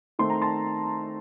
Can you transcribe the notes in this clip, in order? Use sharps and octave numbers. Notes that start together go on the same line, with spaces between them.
D#3 A3 C4 C6
A#5
A5 C6